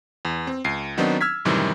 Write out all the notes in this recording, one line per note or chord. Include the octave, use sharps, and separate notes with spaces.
E2
C4
C#2 C7
D#3 F#3 B3 C4 D4 D#4
E6 F6 G#6 B6
F#2 A2 C3 D#3 E3 G3